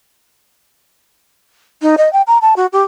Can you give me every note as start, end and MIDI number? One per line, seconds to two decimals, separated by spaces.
1.82 1.95 63
1.98 2.11 75
2.13 2.22 79
2.27 2.38 82
2.42 2.54 81
2.56 2.66 66
2.73 2.83 67